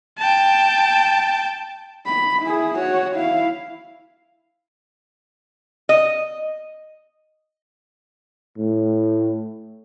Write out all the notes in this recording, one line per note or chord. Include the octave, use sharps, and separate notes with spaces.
G5 A5
B5
E4 G#4
F#4 C#5
E4 F5
D#5
A2